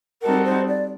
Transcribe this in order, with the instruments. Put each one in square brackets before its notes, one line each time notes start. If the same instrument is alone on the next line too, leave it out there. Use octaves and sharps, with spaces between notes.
[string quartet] G3 C4 D#4 F#4 A4 [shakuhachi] A#4
[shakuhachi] C5
D5